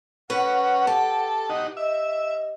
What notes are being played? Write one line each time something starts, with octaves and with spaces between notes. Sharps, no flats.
C#4 F#4 B4 F#5
G4 A4
D#4 F#4
D#5 E5